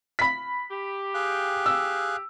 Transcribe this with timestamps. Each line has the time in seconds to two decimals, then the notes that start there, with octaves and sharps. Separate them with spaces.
0.19 B5 B6
0.71 G4
1.14 G#4 F5 F#6
1.66 E6